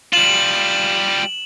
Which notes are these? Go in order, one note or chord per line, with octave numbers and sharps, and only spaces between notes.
G3 F4 E7 F#7